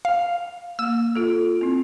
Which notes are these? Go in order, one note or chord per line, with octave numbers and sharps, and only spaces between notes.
F5
A#3 E6
F4 A4
C4 E4